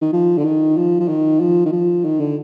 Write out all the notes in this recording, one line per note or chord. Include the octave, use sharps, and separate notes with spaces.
D#3
F3
D3
D#3
F3
F3
D#3
F3
D#3
F3
D#3
D3